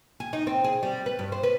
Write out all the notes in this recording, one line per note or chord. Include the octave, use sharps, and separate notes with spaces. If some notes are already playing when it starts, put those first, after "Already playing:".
G#4
D#4
C4
G#4
G3
B4
G2
C5
B4